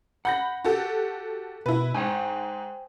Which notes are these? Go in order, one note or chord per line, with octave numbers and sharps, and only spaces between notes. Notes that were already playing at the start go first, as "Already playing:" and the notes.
F#5 B5 G6 A#6
F#4 G4 A4
B2 E4 B4
G#2 C5 G5 G#5